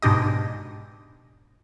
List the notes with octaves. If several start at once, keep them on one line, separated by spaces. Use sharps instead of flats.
G#2 B2 D4 G4 D#5